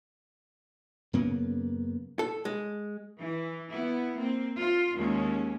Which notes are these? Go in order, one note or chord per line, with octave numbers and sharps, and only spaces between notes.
F#2 C#3 A#3 B3
A4
G#3
E3
B3 E4
A#3 C4
F4
D#2 G#3 C#4